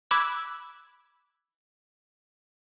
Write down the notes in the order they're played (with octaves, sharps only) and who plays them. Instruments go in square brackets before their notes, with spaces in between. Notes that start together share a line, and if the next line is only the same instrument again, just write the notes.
[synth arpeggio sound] B5 D6 E6 F#6 G#6